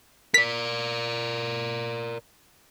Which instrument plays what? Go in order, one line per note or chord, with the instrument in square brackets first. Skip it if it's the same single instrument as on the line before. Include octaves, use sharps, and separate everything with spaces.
[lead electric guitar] A#4 D5 [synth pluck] B6